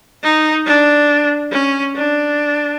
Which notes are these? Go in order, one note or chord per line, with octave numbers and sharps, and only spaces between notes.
D#4
D4
C#4
D4